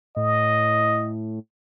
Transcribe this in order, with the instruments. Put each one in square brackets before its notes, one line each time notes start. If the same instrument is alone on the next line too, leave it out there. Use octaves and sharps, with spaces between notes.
[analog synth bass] A2 [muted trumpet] D#5